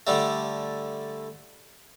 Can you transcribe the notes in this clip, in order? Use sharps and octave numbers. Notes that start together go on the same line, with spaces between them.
D3 G3 A3